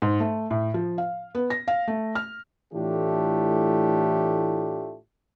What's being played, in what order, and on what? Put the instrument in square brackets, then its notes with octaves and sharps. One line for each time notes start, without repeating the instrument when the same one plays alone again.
[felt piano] G#2
A3
A2
F3
F5
B3
A#6
F5
A3
F6
[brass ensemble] A2 E3 A3 D4 F4 G4